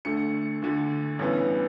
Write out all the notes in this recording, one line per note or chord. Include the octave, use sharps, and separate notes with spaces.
D2 D3 A3 C#7
D2 D3 A3
A1 G2 E3 B3